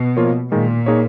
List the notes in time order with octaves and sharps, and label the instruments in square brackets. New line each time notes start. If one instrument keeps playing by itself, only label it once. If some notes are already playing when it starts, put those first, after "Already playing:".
Already playing: [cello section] B2
[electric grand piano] F3 A#3 F4 A#4 C#5
[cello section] A#2 [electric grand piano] D#3 G#3 D#4
[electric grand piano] A#3 D#4 G#4 C#5